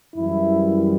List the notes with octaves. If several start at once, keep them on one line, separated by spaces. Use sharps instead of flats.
F#2 E3 G3 E4